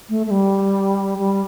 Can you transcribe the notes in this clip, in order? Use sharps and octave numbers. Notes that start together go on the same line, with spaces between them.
A3
A3
G3
G3